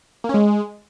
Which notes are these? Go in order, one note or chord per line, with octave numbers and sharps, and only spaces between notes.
A#3
C#4
G#3